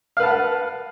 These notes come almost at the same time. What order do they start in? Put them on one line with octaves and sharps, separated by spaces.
F5 B4 A5 F#5